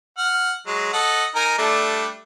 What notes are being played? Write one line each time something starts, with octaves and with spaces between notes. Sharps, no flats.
F#5 F6
F#3 G#3
A4 D#5 F#5
D#4 A#4 G#5
G3 A3 D4